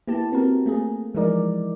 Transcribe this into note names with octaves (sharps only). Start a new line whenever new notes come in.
A#3 B3 E4 G4 A5
B3 C4 F#4 A#4
A3 A#3 G#4
E3 F3 G#3 D#4 A#4 D5